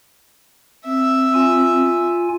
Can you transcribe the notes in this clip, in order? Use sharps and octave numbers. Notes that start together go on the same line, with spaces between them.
C4 E5
F4 G#5